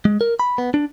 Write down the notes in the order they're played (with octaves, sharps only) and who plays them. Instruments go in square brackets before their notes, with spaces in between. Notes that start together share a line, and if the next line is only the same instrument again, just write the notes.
[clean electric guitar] G#3
A#4
B5
B3
D4